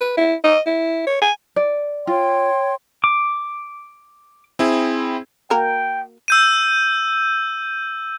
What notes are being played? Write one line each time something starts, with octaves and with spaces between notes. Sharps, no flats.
B4
E4
D#5
E4
C#5
G#5
D5
F4 C#5 G5 C6
D6
C4 E4 G#4
A#3 F#4 A#4 G5
E6 G6 D#7